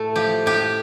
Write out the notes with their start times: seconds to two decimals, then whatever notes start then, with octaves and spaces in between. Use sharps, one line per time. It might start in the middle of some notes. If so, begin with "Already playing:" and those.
Already playing: A2 A3 A4
0.16 F3 G4
0.46 A2 G4